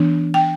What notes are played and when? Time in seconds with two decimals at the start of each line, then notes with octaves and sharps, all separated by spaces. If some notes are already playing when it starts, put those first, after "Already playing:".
Already playing: E3 B3 D4
0.34 G5